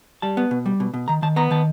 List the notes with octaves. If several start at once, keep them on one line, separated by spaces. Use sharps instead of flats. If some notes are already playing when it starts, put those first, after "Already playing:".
G3 A5
B3
B2
G3
B2
B2
D#3 A#5
D#3 A5
B3 A#5
D#3 A5